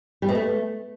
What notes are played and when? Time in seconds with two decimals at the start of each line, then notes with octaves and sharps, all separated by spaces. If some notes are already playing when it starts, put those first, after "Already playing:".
0.22 G3
0.29 B2
0.35 A3